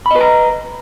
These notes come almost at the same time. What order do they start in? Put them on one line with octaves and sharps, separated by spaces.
B5 D#5 B4 A#5